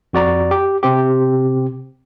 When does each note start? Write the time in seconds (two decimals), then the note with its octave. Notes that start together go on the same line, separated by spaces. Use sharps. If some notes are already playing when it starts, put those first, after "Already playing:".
0.13 F2 F#4 D5 A#5
0.51 G4
0.83 C3 C4 G4